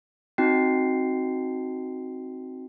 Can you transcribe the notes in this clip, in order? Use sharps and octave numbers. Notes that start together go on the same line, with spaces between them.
C4 D#4 F#4 G5 C7